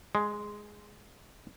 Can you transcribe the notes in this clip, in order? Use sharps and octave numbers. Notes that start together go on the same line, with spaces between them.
G#3